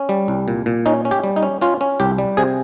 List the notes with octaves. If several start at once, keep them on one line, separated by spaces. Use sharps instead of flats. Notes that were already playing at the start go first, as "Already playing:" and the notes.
Already playing: C#4
G3
C2
A#2
A#2
C#4 D#4
C#4
G4
G3
D#4
C#4
C#4 F4
C#4
C2 G4
G3
C3 G#4